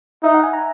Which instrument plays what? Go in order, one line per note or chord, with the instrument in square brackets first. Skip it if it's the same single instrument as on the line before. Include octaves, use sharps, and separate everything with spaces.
[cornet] D#4 [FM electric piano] E5
[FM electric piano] F#5
G#5
A#5